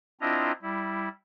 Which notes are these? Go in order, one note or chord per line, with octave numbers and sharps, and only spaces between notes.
C4 D4 E4 F4 D#5 A#5
G3 E4